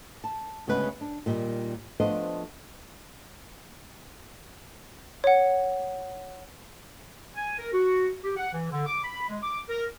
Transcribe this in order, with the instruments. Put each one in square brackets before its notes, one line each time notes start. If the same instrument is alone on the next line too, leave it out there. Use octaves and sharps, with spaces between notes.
[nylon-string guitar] A5
D2 C#3 G#3 B3 B4
D4
A#2 D#3 G3
F3 A3 B3 D4 C5 D#5
[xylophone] C#5 F#5
[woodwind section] G#5
A#4
F#4
G4
F#5
E3
D3
D6
B5
G#3
D6
A#4